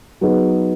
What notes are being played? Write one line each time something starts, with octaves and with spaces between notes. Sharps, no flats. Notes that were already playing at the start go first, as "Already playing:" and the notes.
F#3 B3 D#4 G#4